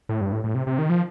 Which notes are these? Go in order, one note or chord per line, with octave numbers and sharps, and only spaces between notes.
A2
G2
A2
A2
C3
C3
D#3
F3